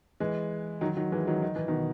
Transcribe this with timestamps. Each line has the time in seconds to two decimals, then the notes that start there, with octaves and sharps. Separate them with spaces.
0.20 E3 G#3
0.81 D#3 F#3
0.97 D#3 F#3
1.12 E3 G#3
1.27 D#3 F#3
1.42 D#3
1.56 E3
1.68 B2 D#3